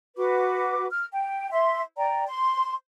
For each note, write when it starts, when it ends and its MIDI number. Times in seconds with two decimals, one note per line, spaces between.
0.17 0.87 66
0.17 0.87 71
0.17 0.87 86
0.90 1.05 89
1.13 1.51 79
1.52 1.82 76
1.52 1.82 84
1.97 2.25 74
1.97 2.25 79
1.97 2.25 82
2.27 2.73 84